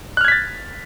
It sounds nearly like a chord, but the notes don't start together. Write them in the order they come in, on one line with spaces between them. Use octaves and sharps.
F#6 F6 G#6 B6 A6